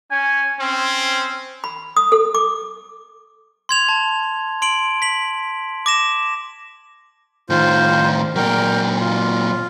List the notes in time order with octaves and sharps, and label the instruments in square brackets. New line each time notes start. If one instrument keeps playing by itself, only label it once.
[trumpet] C#4 [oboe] G#5
[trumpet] C4 [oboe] C#4
[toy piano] B5
D#6
A4
D6
[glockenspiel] C6 G#6 F7
A5
C6 D7 F#7
B6 F#7
D6 A#6 E7
[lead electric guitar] A2 D#3 [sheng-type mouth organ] F4 C5
[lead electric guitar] A#2 F#3 [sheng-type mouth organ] A#4 G5
[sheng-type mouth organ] F4